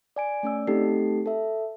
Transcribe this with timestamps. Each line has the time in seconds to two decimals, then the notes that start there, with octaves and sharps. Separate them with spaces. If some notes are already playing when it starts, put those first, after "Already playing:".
0.16 D5 G#5 D7
0.43 A3 C#4 D5 E6
0.67 A3 C4 D#4 G4 A4 C7
1.26 A4 E5